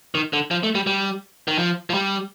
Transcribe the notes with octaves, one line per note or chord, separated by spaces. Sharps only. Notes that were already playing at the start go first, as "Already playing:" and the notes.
D#3
D3
F3
A3
G3
G3
D#3
F3
F3
G3